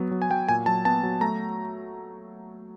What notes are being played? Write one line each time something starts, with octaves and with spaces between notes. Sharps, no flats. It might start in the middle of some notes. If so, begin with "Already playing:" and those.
Already playing: F#3 B3
F#3
G#5
F#3 G5
A#2 G#5
F#3 A5
B3 A5
F#3
A3 A#5